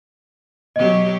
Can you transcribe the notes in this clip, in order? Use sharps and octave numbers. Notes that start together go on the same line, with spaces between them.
B2 F#3 G4 D#5